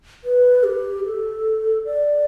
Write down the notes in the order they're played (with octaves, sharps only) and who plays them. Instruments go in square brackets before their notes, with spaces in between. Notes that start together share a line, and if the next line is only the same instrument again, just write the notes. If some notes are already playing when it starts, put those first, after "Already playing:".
[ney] B4
G4
A4
D5